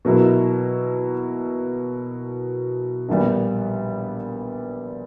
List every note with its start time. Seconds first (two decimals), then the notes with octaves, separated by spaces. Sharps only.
0.05 B2 F#3 A#3 E4
3.09 A#1 A#2 G3 B3